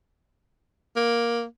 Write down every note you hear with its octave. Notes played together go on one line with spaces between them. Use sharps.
A#3